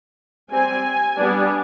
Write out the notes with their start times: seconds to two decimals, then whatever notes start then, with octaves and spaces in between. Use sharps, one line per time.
0.50 G3 C4 G#5
1.17 G3 B3 D4